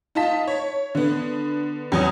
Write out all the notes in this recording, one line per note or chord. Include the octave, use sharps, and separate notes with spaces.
D#4 F4 D#5 A5 B6
C#5
D3 B3
E2 F#3 D#6